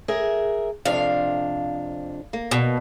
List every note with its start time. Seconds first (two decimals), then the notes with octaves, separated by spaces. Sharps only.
0.08 G#4 A#4 E5
0.85 F2 C3 D4 F5
2.33 A#3
2.51 B2